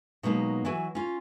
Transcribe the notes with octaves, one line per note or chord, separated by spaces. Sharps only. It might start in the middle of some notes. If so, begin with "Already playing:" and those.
B2 F#3 G#3 A#3 B3 D#4
E3 F#3 F#4 G#5
C#4 F4